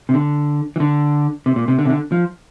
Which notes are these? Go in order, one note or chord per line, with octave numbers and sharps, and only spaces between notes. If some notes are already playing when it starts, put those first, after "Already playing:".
C3
D3
E3
D3
C3
A#2
C3
D3
C3
D3
F3